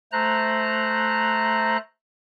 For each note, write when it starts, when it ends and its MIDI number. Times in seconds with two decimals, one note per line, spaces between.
0.12 1.77 57
0.12 1.77 72
0.12 1.77 82
0.12 1.77 90